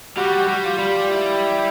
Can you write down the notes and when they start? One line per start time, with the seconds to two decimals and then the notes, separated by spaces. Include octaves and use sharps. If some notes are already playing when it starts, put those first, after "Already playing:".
0.17 G3 F#4
0.48 G3
0.64 F4
0.79 G3
1.10 E4